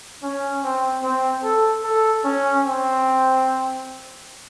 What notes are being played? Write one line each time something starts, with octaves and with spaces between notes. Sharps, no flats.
C#4
C4
C4
A4
A4
C#4
C4